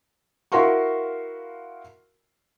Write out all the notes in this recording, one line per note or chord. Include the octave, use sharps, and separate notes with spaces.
E4 F#4 A#4 F5 C6 C#6